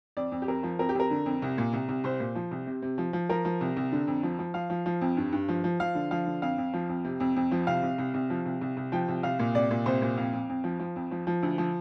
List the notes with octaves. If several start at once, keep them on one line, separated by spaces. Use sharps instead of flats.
F2 D5
F2
G4
F2 A#4
F3
F2 A#4
G4
F2 A#4
D3
F2
C2
A#2
C2
C2
C2 C5
A#2
F3
C2
C3
C3
F3
F3
F3 A#4
F3
C2
C2
D3
F2
F3
F3
F3 F5
F3
F3
F2
G2
G2
F3
F3
F3 F5
D3
F3 F5
D3
F2 F5
F2
F3
F2
C3
F2
F2
F3
C2 F5
C2
C2
C2
F3
C2
C2
C2
F3 G5
C2
C2 F5
A#2
C2 D5
A#2
C2 C5
A#2
F2 F5
F2
F2
F3
F3
F2
F3
F3
D2
F3